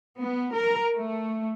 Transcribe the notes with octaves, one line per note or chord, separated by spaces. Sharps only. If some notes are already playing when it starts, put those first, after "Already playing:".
B3
A#4
A3